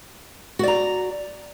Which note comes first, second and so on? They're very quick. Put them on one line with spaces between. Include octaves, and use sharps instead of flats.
F#4 D5 A#5